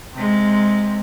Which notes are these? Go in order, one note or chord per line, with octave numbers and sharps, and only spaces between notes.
C3 G#3